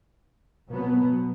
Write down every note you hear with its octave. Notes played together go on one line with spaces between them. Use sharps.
B2 F#3 B3